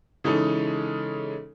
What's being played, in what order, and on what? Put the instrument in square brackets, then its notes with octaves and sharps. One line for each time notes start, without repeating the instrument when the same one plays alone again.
[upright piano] C#3 E3 G#3 C#4 D#4 A4